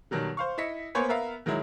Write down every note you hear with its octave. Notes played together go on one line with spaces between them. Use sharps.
B2 D#3 F#3 G3
C5 F5 C#6
E4 D#5 B6 C#7
A#3 B3 C5 C#5 G#5
B3 A#4 E5 F5
D#3 F#3 G#3 E4